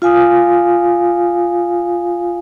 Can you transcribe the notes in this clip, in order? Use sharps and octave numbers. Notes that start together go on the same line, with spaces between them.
F4 F5 G#5 D#6